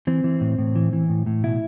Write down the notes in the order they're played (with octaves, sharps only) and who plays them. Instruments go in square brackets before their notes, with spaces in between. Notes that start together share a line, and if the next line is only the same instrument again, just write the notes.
[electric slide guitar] E3 C4
E3
A2
A2
E3
E3
A2
A2
B2 E4